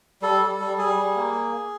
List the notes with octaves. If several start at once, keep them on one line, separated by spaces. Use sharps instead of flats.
G3 A4
G3
G3
G3 G#4
G3
A#3